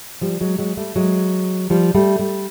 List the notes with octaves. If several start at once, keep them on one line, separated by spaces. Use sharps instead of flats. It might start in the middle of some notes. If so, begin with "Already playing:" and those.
F3 G3
F#3 G#3
F#3 G#3
G3 A3
F#3 G#3
F3 G3
G3 A3
G3 A3